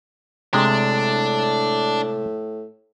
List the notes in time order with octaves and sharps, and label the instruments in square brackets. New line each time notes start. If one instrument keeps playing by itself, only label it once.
[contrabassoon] A2 [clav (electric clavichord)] C3 G#3 [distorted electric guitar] D4